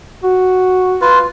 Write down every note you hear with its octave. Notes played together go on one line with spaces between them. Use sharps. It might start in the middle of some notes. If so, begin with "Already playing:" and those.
F#4
F4 B4